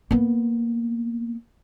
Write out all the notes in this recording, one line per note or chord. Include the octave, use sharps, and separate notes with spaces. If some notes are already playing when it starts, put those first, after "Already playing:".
A#3 B3